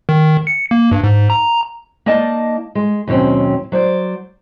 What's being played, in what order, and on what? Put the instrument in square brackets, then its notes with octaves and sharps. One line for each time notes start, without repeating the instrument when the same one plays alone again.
[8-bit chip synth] D#3
C#7
A#3
G2
G#2
A#5
[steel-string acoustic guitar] A#3 D#4 D5 D#5 A5
G#3
D#2 B2 F#3 C4 C#4
F#3 C5 D5